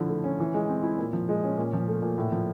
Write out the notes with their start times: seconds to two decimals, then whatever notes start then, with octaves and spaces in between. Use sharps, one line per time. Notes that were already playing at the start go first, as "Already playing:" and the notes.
Already playing: D3 F3 E4
0.09 A3
0.24 C#4
0.40 E3
0.54 G#3
0.69 C4
0.83 E4
0.98 A#2
1.13 F3
1.29 G#3
1.44 C#4
1.57 A#2
1.73 F3
1.88 A3
2.02 A#2
2.18 A2
2.32 F3